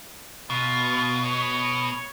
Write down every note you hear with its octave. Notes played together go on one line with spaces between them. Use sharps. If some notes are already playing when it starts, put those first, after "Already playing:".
B2 F4
C#5